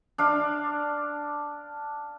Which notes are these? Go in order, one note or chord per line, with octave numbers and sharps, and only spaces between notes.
D4 F5